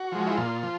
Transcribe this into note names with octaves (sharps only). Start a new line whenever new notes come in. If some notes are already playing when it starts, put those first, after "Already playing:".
Already playing: F#4
F3 G#3
E4
A#2 F4
F3